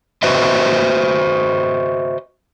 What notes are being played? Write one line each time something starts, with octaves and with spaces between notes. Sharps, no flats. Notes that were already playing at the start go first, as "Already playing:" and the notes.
F#4 B4 C5 D#5 E5